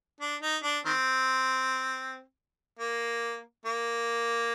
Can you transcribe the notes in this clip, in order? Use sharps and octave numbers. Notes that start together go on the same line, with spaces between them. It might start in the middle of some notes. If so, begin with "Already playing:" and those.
D4
D#4
D4
D#3 C4
A#3
A#3